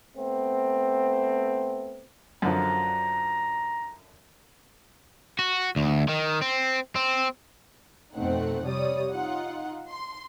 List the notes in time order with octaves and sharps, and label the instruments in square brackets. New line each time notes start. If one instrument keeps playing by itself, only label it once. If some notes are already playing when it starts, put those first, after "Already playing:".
[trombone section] A3 B3 C4
[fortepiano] F#2 D3 F3 [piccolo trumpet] A#5
[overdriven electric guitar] F#4
D2
D#3
C4
C4
[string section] F2 B2 A3 C4 D#4 F#5
C3 G3 C#5 D5 D#6
D#4 F4 F#5
C6